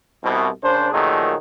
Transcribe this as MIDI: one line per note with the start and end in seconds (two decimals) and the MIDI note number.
0.24 0.48 36
0.24 0.48 47
0.63 0.90 49
0.63 0.90 62
0.63 0.90 70
0.63 0.90 72
0.92 1.34 46
0.92 1.34 51
0.92 1.34 53
0.92 1.34 54
0.92 1.34 57
0.92 1.34 68